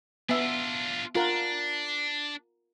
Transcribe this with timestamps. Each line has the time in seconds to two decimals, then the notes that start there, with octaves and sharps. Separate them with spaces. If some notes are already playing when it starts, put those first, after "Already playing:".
0.29 B3 D4 F4 E5
1.15 D4 F4 A#4 F#5